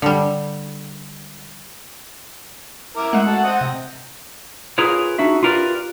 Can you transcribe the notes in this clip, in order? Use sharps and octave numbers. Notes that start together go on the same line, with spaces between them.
D3 G3
E4 A#4 D6
G#3 A3 F#5
F#4 A4
C4 D#5 D#6
C3
F4 G#4 A#4 B4 C#5
D4 D#4 F#4 E5
F4 G4 A#4 B4 D5